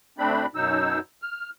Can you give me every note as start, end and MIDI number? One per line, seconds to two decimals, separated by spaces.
0.18 0.46 38
0.18 0.46 57
0.18 0.46 60
0.18 0.46 62
0.18 0.46 83
0.55 1.00 42
0.55 1.00 47
0.55 1.00 54
0.55 1.00 63
0.55 1.00 88
1.22 1.50 89